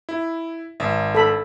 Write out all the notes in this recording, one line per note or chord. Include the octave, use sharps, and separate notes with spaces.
E4
G#1 E5
A4 B5